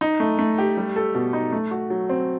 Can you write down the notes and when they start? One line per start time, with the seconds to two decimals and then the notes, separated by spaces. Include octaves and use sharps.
0.01 D#4
0.20 A3
0.39 A3
0.58 G4
0.77 G3
0.96 A4
1.15 B2
1.33 D#4
1.52 A3
1.71 F#4
1.90 F#3
2.09 C4